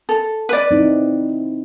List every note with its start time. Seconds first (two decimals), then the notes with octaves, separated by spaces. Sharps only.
0.09 A4
0.49 B4 D5
0.71 C4 D#4 E4